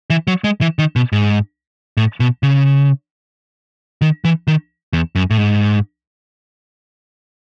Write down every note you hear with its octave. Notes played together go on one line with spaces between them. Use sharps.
E3
F#3
G#3
E3
D#3
B2
G#2
A2
B2
C#3
D#3
E3
D#3
E2
F#2
A2
G#2